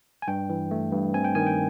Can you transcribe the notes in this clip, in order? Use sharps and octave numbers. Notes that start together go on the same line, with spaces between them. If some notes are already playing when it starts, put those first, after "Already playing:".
G#5
G2 G5
E3
A3
G2
C4 G#5
G5
D#3 G#5
G5